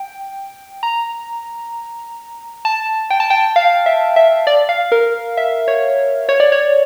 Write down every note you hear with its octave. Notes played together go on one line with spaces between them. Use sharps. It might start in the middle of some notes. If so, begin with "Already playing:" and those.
Already playing: G5
A#5
A5
G5
A5
G5
F5
E5
E5
D5
F5
A#4
E5
C#5
C#5
D5
C#5